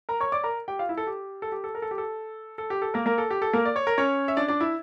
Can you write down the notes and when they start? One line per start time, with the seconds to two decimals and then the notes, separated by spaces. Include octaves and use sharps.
0.09 A#4 A#5
0.21 C#5 C#6
0.32 D5 D6
0.44 A#4 A#5
0.68 G4 G5
0.79 F4 F5
0.89 E4 E5
0.97 A4
1.07 G4
1.42 A4
1.52 G4
1.64 A4
1.75 A#4
1.82 A4
1.91 G4
1.98 A4
2.58 A4
2.70 G4
2.82 A4
2.94 A#3 A#4
3.06 A#3 A#4
3.18 A4
3.31 G4
3.42 A4
3.53 A#3 A#4
3.65 D5
3.76 C#5
3.87 A#4
3.98 C#4 C#5
4.28 E5
4.37 D4 D5
4.48 D4 D5
4.60 E4 E5